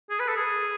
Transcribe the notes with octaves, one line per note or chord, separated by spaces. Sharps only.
G#4
B4
A4
G#4